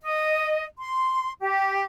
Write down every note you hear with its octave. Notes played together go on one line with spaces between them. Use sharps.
D#5
C6
G4